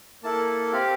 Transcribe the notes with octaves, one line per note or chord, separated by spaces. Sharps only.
A#3 E4 A4 A5
C4 G4 F5